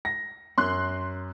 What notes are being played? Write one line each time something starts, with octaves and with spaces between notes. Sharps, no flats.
A#6
F#2 C6 F#6